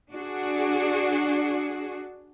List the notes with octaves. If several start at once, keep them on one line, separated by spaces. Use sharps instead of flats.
D4 F#4 G#4